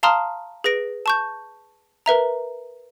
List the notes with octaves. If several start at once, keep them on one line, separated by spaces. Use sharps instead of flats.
F5 A5 A#5 C6 D#6 F6
G#4 B4 A#6 D7
A5 C#6 G6
A#4 B4 E5 A#5